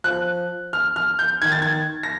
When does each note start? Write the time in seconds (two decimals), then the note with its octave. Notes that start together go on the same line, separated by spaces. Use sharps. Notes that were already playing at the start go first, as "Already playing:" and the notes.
0.04 F3 F#6
0.73 F6
0.96 F6
1.19 G6
1.42 D#3 G#6
1.52 A6
1.62 G#6
2.03 A#6